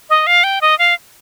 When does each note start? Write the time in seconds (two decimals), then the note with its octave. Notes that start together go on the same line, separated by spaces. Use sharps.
0.10 D#5
0.27 F5
0.44 G5
0.61 D#5
0.79 F5